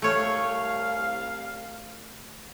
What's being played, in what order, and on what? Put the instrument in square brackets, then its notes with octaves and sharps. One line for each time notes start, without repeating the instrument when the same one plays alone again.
[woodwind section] C2 F5 [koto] A3 C#5